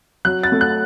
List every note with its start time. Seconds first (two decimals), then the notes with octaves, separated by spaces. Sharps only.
0.25 F#3 F#6
0.44 A6
0.52 A3
0.61 F#6